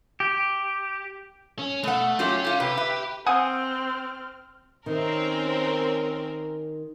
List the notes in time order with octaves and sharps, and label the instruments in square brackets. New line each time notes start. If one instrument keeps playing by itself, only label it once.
[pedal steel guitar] G4
[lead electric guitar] C#4
[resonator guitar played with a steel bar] B2 F#5 [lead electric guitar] A3
[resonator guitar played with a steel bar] F#3 A3 F4 [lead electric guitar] C#4 [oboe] G4
[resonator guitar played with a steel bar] A3 F4 [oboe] G4
[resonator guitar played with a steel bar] C3 [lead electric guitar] G4 [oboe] B4
[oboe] B4 [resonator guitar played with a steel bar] E5
[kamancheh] C4 F6 [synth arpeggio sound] F#5 G#5 D#6
[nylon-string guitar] D#3 [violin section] C4 C#4 A#4